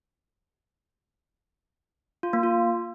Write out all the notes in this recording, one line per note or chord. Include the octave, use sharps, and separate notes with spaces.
F4
A#3
F4